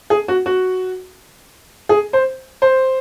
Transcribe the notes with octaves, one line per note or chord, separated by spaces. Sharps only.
G#4
F#4
F#4
G#4
C5
C5